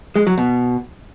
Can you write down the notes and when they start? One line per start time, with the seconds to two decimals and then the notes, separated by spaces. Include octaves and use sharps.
0.16 G#3
0.27 F#3
0.38 B2